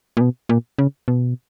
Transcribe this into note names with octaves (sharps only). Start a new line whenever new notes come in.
A#2
B2
A#2
C#3
B2